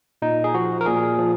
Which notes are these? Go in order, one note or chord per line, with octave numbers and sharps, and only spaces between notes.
A#2 D#4
G#4
F3 F#4
A#4
A#2 G#4
F3